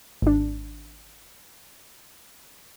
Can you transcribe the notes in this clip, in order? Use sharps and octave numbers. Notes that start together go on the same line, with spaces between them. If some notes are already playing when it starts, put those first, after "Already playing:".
G#1 D4